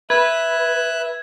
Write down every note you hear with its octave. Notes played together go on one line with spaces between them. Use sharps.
B4 E5 F#6 G#6